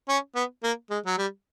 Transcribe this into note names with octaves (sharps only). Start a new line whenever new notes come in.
C#4
B3
A#3
G#3
F#3
G3